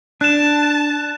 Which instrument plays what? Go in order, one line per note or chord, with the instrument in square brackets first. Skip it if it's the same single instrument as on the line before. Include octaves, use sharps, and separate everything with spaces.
[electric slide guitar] D4 [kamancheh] A5 [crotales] F#6 E7